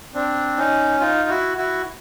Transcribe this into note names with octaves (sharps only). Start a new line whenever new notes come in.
C4 D4
C#4 D#4
D#4 F4
E4 F#4
E4 F#4